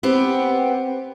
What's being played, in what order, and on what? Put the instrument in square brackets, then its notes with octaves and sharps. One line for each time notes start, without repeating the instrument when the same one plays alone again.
[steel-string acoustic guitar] B3 C4 G4